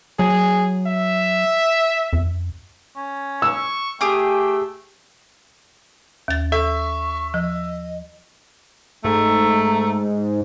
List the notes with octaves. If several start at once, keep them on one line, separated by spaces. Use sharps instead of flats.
F#3 G#4
E5
F2
C#4
C#6 E6
A3 G4 G#4 G5
D#2 A6
A4 E5 C#6
F3 D#5
G#2 A3 A#5